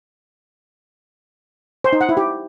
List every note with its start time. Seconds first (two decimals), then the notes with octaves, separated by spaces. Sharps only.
1.84 C5
1.93 D#4
2.01 F#5
2.09 E4
2.17 G4